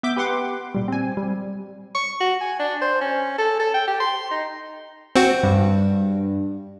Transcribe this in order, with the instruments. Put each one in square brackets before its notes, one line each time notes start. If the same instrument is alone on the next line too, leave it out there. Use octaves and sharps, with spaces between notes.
[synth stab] B3 E5 D6 G6
G4 B4 F#5 C6 D6
A#2 G3
C4 G#5
G3
[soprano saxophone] C#6
F#4
G#5
D4
C5
C#4
A4
A4
G5
G4
C6
D#4
[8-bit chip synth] C4 F#4
[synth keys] G2